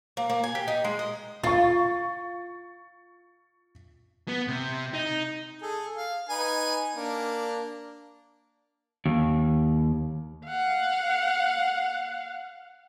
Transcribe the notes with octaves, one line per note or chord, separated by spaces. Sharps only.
A#3
A#3
G#5
G4
D#4
G#3
D#5
F4 C#6 A6
B3
C3
D#4
G#4 A4
F5
D#4 B4 G#5
A#3 D4
D#2
F5 F#5